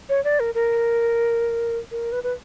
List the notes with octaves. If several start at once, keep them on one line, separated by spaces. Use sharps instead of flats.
C#5
D5
A#4
A#4
A#4
B4
B4